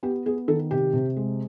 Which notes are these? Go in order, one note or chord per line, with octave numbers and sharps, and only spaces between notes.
B3 G4
B3 G#4
D#3 A4
C3 G4
C3
G#3